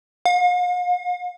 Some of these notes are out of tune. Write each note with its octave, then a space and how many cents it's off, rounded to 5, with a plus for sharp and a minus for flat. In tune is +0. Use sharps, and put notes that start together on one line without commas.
F5 +45